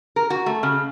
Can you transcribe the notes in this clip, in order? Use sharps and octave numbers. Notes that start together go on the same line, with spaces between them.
A#4
F#4
A3
C#3